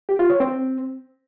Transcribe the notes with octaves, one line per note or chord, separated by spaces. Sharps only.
G4
F4
C#5
C4